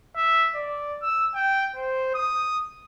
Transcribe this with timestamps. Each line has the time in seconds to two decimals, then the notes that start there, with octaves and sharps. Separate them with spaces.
0.16 E5
0.55 D5
1.02 E6
1.35 G5
1.76 C5
2.14 D#6